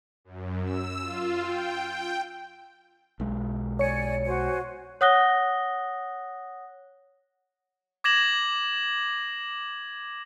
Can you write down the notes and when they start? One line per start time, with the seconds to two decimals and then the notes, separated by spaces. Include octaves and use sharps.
0.24 F#2
0.64 E6
1.02 F4
1.41 G5
1.91 G5
3.20 B1 G#3
3.79 C#5 D5 G#5 C#7
4.25 F#4 C5 G#5
5.01 C#5 F#5 D#6 F#6 A#6 G7
8.04 D6 G#6 A#6 E7 F#7